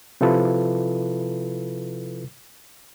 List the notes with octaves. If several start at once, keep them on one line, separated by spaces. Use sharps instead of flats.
C3 F3 E4 F4 A4 B4